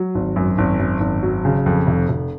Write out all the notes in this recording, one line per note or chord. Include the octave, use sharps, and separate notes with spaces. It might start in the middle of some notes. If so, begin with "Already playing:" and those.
Already playing: F#3
G#1
F#2
G#1
F#2
G#1
F#3
C#3
F2
F1
F1